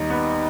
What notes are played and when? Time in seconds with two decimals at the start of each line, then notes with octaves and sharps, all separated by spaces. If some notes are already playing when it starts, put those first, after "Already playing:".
Already playing: D#2 G3 D#4
0.10 B3